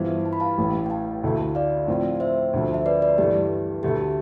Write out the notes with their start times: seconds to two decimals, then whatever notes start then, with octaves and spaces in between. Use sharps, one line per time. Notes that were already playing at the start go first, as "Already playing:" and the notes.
Already playing: G2 E3 B3 F4 C5 E5
0.26 A5
0.33 B5
0.40 F5 A5
0.58 A1 A2 E3
0.86 G5
0.90 F5 A5
1.23 D2 D3 A3 E4
1.55 D5 F5
1.88 A2 F3 C4 F4
2.20 C5 E5
2.53 D2 D3 F3
2.74 E5
2.86 B4 D5
3.02 B4 D5
3.18 G2 E3 A3 G4
3.83 D2 D3 A3 G4